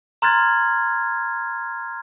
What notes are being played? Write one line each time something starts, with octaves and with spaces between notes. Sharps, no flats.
A#5 C6 F6 F#6 G#6 A6